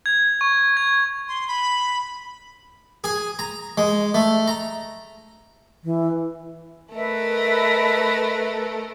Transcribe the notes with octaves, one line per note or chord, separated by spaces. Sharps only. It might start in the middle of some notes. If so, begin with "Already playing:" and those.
G#6
C#6
G#6
C6
B5
G#4
A#5
G#3
A3
A#5
E3
A3 A#4 B4 D#5 E5